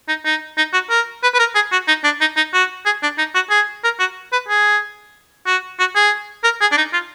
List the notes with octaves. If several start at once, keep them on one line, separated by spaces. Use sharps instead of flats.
D#4
D#4
D#4
F#4
A#4
B4
B4
A#4
G#4
F#4
D#4
D4
D#4
D#4
F#4
G#4
D4
D#4
F#4
G#4
A#4
F#4
B4
G#4
F#4
F#4
G#4
A#4
G#4
D4
D#4
F4